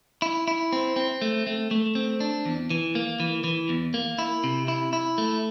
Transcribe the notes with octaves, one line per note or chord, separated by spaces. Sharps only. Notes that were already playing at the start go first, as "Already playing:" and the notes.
E4
E4
C4
C4
A3
A3
A3
C4
D4
E2
E3
A#3
E3
E3
E2
A#3
E4
C3
E4
E4
A3